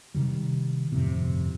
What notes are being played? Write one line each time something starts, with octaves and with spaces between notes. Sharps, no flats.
C3 D#3 G3
G1 F2 A2 C3